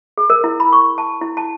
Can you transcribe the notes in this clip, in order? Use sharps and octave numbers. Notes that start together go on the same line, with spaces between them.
G#4
A#4
E4
B5
C#6
A5
E4
A5